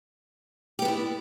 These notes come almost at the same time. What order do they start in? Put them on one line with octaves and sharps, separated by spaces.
G4 B3 D4 E4